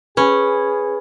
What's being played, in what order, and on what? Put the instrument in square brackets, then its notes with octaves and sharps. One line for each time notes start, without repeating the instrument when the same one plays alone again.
[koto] C#4 [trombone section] G#4 [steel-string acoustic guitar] B4